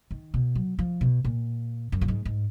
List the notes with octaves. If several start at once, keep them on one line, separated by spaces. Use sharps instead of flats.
D#3
B2
F#3
F3
B2
A#2
F#2
A#2
G#2
G#2